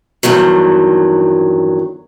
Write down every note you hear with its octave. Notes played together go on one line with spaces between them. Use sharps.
E2 G2 D#3 F#3